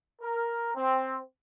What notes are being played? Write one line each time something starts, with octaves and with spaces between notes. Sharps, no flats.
A#4
C4